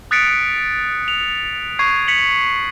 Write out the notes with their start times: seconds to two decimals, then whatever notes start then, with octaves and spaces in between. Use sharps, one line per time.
0.11 D#6 F#6 A6 B6 C#7 D7
1.08 F7
1.79 C#6 G#6 C7
2.08 B6 C#7 F7 F#7